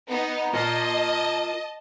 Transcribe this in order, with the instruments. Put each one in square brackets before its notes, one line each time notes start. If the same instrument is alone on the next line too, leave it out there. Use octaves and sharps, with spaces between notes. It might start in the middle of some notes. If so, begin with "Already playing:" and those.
[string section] B3 D#4
[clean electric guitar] F4 A#4 A#5 [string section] D#5 A5